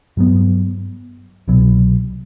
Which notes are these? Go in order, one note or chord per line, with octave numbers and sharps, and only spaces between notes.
G2 F#3 B3
C2 B2 F#3